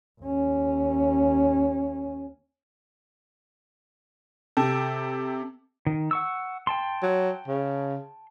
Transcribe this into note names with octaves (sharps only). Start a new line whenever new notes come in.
D#2 C#4
C3 A4 G5 A5
D#3
F#5 C#6 E6
G5 A5 C6
F#3
C#3